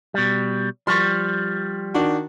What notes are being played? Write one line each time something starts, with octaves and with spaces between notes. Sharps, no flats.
B2 G3
F3 G3 C6 C#6
D#3 D4 F#4